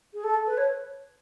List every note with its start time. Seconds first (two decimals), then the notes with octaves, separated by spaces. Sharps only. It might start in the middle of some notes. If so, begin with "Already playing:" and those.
0.13 G#4
0.23 A4
0.46 B4
0.57 C#5